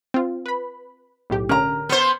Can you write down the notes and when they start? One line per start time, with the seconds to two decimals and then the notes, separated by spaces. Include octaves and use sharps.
0.14 C4 F4
0.46 B4 B5
1.30 B1 A2 G4
1.49 D3 C#4 A#4 A#5
1.89 B3 C5 F6 G6 C#7